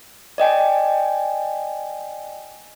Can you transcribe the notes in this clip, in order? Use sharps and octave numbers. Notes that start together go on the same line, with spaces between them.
D5 D#5 G5 G#5